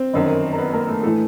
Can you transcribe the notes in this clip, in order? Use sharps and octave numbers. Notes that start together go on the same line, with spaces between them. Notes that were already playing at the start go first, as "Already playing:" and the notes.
Already playing: C4
G1 F#2 D#3
A#4
B3 B4
A#3 A#4
A3 A4
A2 E3 A3 A4